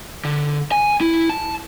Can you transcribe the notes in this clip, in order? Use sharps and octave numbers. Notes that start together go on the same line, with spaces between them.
D3
G#5
E4
A5